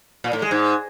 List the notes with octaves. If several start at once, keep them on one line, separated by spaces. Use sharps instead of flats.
A#2
A2
G#3
G#2